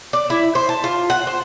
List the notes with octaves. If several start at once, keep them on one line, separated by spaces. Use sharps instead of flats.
D5
E4
C5
A5
F4
F#5
C5